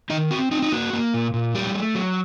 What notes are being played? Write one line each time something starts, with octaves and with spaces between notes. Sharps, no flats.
D#3 D#4 D#5
C4 F#4
C4 D#4
D#4
A#3 F#4
A#3
A#2
A#2
F#3 G3 G4
A3
F#3